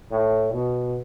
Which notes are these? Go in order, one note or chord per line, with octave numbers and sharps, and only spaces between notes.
A2
B2